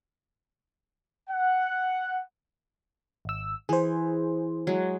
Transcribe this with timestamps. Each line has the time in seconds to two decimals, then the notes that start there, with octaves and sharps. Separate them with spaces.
1.30 F#5
3.25 G#1 E6
3.69 E3 G#4 C5
4.67 F#3 G#3